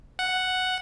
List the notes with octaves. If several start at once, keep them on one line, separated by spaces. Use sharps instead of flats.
F#5